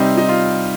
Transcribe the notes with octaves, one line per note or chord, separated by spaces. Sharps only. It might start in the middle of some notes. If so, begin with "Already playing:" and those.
Already playing: C3 G3 C4 D#4
D#4
F4